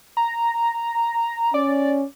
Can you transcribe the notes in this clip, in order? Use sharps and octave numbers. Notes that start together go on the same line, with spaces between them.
A#5
C#4 D5